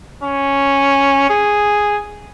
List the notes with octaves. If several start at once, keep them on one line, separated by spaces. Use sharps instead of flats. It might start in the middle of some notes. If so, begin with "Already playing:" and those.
C#4
G#4